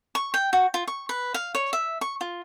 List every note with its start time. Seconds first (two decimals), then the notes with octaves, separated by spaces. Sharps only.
0.15 C#6
0.34 G5
0.53 F#4
0.74 F4
0.88 C#6
1.09 B4
1.34 F5
1.55 C#5
1.73 E5
2.01 C#6
2.21 F4